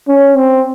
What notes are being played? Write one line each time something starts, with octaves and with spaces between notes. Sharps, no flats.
C#4
C4